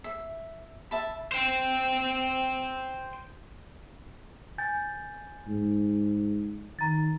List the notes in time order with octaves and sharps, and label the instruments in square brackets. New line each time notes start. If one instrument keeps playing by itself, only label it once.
[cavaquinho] E5
E5 A5 B5
[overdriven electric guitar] C5 G5
[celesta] G#5 G6 A6
[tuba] G#2
[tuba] D#3 [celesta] A#5 A6